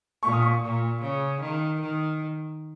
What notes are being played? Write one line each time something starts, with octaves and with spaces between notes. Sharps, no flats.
A#2 C#6
D#6
C#6
A#2
C#3
D#3
D#3